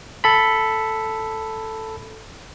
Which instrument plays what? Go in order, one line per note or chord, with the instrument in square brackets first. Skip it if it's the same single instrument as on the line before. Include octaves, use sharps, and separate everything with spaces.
[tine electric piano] A4 B5